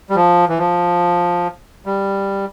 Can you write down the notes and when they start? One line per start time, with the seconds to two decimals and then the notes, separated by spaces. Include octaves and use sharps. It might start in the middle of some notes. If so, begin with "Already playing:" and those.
0.10 G3
0.15 F3
0.49 E3
0.58 F3
1.86 G3